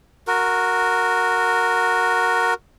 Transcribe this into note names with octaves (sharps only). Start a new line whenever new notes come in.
F#4 A#4